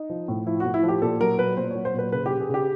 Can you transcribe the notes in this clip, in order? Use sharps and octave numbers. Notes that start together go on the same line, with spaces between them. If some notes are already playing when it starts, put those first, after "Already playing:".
Already playing: D#4
F3
A2
F3 E4
F#4
A2
E4
F3
G4
A#2 A4
F#3 A#4
A#2 B4
A#2 C5
F#3 C#5
C5
A#2 B4
C#3 B4
G4
C#3
G#4
C#3 G4